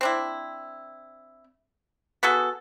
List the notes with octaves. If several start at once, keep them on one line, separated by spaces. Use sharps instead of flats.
C4 D4 E4
B3 F#4 G#4 A4